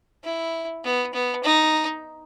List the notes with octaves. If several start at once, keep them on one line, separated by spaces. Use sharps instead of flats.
E4
B3
B3
D#4